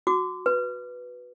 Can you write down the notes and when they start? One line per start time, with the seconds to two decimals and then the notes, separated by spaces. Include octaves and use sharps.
0.07 F#4 D6
0.46 B4